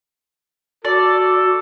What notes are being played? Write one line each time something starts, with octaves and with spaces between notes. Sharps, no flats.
F#4 A4 D5